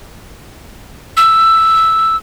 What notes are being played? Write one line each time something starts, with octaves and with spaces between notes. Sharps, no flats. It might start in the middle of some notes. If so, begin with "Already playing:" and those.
E6